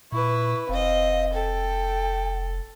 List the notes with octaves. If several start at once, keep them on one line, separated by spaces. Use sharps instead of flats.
A#2 E4 B4 C#6
F1 C4 D#5 F5
A4 G5